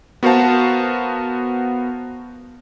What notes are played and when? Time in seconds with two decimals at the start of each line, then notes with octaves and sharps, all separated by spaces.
0.23 B3 F#4 A#4 C5 F5 A5